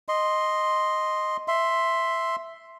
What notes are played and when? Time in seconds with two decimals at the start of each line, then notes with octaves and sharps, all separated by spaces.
0.08 D#5 C6
1.48 E5 C6